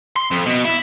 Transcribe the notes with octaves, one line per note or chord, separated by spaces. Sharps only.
C6
F2
B2
E4